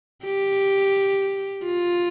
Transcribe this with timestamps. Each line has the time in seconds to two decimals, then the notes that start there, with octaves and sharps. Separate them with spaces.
0.24 G4
1.64 F4